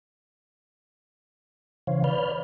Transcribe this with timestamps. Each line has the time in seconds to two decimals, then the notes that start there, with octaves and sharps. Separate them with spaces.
1.87 C#3 E3 C5 C#5 F5
2.04 B4 C#5 D5 B5 F6 G6